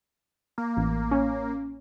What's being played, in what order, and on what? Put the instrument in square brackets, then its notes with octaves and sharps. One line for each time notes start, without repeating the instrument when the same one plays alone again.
[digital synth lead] A#3
[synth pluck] A1
C#4